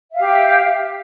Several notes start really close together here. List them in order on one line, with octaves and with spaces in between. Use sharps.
E5 F5 G4